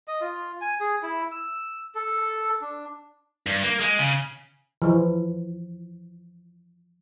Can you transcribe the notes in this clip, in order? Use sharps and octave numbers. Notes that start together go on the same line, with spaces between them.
D#5
F4
G#5
G#4
E4
E6
A4
D4
G2
A#3
G#3
C#3
E3 F3